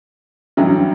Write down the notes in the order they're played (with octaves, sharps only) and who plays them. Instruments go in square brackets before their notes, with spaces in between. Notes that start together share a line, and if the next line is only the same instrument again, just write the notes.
[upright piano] A1 G2 F#3